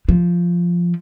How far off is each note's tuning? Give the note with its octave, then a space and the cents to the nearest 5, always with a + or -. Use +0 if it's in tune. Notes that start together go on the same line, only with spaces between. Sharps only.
F3 -5